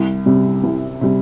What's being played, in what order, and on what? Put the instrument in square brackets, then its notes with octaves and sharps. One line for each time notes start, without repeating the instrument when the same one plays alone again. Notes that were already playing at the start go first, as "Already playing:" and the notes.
Already playing: [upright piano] C2
C3 G3
C2
C3 G3